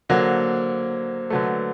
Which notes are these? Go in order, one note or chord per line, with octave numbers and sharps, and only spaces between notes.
D3 F#3 A#3 C5
D3 F#3 A3 B4